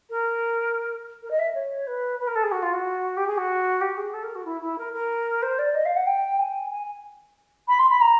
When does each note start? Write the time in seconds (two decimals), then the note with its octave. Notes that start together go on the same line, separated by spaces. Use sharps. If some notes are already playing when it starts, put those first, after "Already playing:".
0.10 A#4
1.23 A#4
1.31 D#5
1.39 E5
1.55 C#5
1.87 B4
2.19 B4
2.27 A#4
2.35 A4
2.43 G#4
2.52 F#4
2.62 F4
2.73 F#4
3.17 G4
3.27 G#4
3.37 F#4
3.81 G4
3.97 G#4
4.13 A4
4.23 A#4
4.35 F#4
4.45 E4
4.61 E4
4.78 A#4
4.93 A#4
5.42 C5
5.58 D5
5.75 D#5
5.85 F5
5.96 F#5
6.06 G5
6.39 G#5
6.71 G#5
7.68 B5
7.79 C6
7.90 B5
8.01 A#5